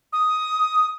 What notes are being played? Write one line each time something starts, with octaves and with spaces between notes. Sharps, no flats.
D#6